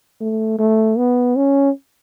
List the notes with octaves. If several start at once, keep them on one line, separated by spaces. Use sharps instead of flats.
A3
A3
B3
C#4